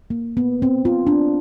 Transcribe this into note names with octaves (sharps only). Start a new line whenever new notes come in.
A#3
B3
C4
F4
D4